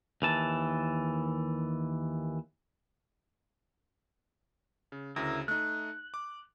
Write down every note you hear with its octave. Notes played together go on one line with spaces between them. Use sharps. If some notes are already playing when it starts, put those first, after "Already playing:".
D#2 E3 A5
C#3
D2 C#3 E4 A#4
A3 D#4 F#6
D6